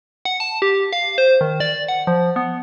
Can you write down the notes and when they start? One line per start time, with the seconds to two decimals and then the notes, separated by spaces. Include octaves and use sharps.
0.25 F#5
0.40 A5
0.62 G4
0.93 F5
1.18 C5
1.41 D#3
1.60 D5
1.88 F#5
2.07 F3
2.36 B3